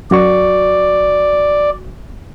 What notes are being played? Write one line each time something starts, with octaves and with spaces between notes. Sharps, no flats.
F#2 F#4 D5 C#6